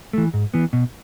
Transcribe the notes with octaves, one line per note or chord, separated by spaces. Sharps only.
E3 A3
G#2
E3 B3
B2